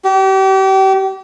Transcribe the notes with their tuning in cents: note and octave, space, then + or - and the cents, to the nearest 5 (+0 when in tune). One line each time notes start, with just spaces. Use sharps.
G4 -35